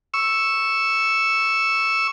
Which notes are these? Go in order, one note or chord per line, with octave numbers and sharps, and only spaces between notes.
C#6 E6